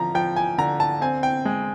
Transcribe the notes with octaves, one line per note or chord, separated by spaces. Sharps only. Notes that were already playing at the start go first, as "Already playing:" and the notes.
Already playing: D3 F3 A#5
F3 G5
G#5
D3 A#5
A5
C4 G#5
G5
G#3